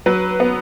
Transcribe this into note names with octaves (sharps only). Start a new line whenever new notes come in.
F#3 B4
B3